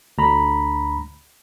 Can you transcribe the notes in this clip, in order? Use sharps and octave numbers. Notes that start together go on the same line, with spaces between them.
D2 A#5 B5